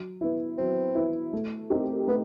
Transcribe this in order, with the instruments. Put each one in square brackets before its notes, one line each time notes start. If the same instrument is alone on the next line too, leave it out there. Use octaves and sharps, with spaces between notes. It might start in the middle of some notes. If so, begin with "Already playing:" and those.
Already playing: [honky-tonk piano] F#3
B3 E4
[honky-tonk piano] F#3 [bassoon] C4
[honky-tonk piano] B3 E4
A3
C4 D#4 G4 A#4
[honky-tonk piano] A3 [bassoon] B3